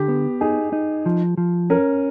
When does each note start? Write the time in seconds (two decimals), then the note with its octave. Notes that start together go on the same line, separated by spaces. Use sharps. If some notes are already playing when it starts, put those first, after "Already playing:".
Already playing: D3 G4
0.08 B3
0.41 D#4 G#4
0.73 D#4
1.06 F3
1.38 F3
1.70 C#4 A#4